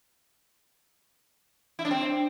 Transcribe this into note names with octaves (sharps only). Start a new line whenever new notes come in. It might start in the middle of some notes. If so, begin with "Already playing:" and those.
E4
D4
C4